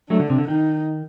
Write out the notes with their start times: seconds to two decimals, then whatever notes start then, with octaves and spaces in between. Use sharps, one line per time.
0.10 F#3 A3 D4
0.19 D3
0.30 C3
0.38 D3
0.48 D#3 D#4